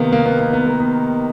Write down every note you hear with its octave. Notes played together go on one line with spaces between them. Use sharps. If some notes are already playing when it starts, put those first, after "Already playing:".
Already playing: C3 D#3 A#3 B3
A#3
B3
A#3
B3
A#3
B3